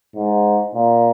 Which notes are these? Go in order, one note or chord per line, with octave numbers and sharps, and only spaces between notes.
G#2
A#2